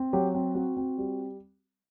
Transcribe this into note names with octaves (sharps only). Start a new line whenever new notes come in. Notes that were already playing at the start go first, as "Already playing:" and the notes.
Already playing: C4
F#3 G4
C4
C4 F#4
C4
G3